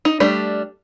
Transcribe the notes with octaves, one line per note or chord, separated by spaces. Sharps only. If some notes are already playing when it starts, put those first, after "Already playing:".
D#4
G3 A3 D4